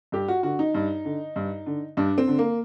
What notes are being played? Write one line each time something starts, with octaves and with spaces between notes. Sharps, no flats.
G2 G4
F#4
D3 F#4
D#4
G2
D3
G2
D3
G2 D4
C4
D3
A#3